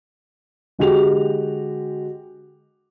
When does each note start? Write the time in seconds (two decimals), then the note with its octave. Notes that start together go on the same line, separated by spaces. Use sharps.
0.79 D3 G#3 F#4 G4 F7